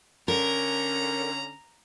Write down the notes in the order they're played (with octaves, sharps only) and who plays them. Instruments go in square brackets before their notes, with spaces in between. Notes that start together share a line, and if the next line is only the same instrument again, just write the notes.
[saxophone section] D3 C#4 [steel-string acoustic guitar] A#4 [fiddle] A#5